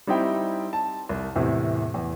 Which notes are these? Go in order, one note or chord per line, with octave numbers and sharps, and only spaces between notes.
G3 C4 D#4 E4 G5
A5
C2
E2 A2 C3
E2